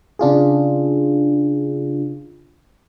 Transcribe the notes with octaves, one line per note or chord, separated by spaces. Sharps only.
C#3 D4 F4 G#4